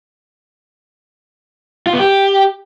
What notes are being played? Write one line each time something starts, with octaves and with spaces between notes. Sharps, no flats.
F4
B3
G4